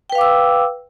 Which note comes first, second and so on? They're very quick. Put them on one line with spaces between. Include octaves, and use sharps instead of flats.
G5 B4 F5 D6 E6